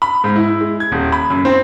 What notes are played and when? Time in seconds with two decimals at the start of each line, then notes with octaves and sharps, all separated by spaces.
0.02 B5
0.24 G#2
0.36 E4
0.61 G#3
0.80 G#6
0.92 D#1
1.12 B5
1.30 F#2
1.45 C4